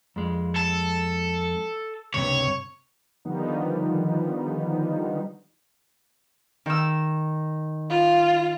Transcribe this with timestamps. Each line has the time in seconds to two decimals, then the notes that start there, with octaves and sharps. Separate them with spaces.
0.16 F2 G#3
0.56 A4
2.14 C#2 G2 C3 C#5
3.25 D3 D#3 F3 G3 B3 D#4
6.66 D#3 E6
7.90 F4